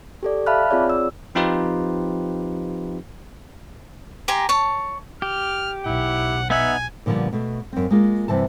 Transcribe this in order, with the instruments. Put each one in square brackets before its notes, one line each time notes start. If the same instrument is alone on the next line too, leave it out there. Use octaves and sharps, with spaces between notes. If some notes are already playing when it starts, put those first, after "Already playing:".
[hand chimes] G4 A4 D5
E5 F5 A5 B5 F6 F#6
C4 F4 G#4 C#5 D5
E6
[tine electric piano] F3 C4 D#4 F4 G4 B4
[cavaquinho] G4 G#5 A#5 C6
C#5 A5
[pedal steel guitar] G4 [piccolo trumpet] F6
[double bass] B1 [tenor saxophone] E4 [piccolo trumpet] F#5
[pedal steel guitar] B3 D#4 F#5 [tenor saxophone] E5 [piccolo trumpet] G#5
[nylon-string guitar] A#2 D3 F3 G3 B3
B2 A3
F#2 C4
G#3 A#3 F4
G2 C3 E3 A5